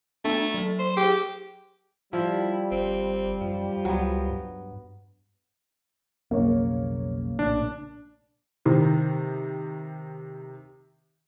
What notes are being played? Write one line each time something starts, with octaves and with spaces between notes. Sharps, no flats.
A3 B3 D4
F#3 A4
C5
G4 G#4
F3 G3 E4
G1 C4
F#2 F3
C#2 F#3 B3
G2
B1 F2 C#3 A#3 C#5
A#1 A2 C#3 D4
C3 D#3